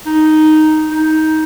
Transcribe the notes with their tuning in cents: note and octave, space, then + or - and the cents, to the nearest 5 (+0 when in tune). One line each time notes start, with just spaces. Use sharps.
D#4 +0
D#4 +15